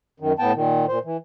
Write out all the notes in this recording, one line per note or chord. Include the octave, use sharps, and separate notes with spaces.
F#2 D#3
A2 B3 G5 A5
A#2 D#3
A#2 C5
E3